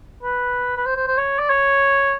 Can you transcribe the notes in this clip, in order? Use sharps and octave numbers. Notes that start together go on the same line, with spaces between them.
B4
B4
C5
C5
C5
C#5
D5
C#5